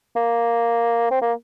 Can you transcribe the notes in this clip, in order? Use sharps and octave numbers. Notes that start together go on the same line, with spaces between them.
A#3
C4
A#3